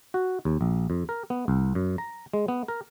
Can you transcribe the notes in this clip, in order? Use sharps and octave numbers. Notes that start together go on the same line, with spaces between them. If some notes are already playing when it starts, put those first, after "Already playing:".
F#4
D#2
A#1
F2
A#4
B3
C2
F#2
A#5
G#3
B3
A#4